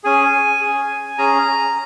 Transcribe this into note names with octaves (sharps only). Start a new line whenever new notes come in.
C#4 G#4 G#5
G#4
C#4
C#4 G#4 A#5